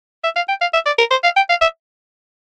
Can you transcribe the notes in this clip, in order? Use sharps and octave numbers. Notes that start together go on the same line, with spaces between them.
E5
F5
G5
F5
E5
D5
A#4
C5
F5
G5
F5
E5